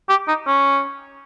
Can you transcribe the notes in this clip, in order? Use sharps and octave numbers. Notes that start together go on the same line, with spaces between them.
G4
D#4
C#4